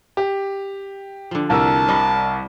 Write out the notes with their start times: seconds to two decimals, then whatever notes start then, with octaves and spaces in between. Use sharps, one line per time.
0.17 G4
1.31 D3 F3
1.50 C2 A#4 A5 E6
1.88 C3 G3 D#5